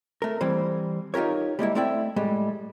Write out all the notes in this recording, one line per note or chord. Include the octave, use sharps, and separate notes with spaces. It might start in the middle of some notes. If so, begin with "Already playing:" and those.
A3 A#4
E3 G3 C4
D#4 F4 G4 A#4 C#5
G3 G#3 A#3 E4
A3 C4 E4 D5 E5 G5
A2 G3 G#3